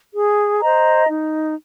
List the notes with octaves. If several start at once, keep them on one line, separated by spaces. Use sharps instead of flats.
G#4
C5 D#5 A#5
D#4